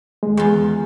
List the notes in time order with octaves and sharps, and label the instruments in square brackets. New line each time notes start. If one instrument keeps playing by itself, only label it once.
[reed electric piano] D#2 G#3
[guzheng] E2 F4